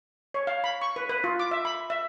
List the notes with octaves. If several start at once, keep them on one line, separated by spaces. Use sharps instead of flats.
C#5
F5
B5
C#6
B4
B4
F4
D6
E5
B5
E5